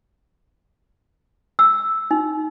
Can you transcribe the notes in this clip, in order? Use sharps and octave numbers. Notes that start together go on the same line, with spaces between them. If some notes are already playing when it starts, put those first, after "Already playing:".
E6
D#4